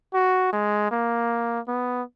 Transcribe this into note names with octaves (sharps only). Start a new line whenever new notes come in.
F#4
G#3
A#3
B3